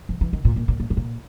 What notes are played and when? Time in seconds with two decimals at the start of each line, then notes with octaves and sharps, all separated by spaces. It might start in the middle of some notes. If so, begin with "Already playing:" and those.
0.09 F3
0.21 E3
0.33 D#3
0.45 A#2
0.56 A#2
0.68 A#2
0.80 A#2
0.90 A2
0.97 A#2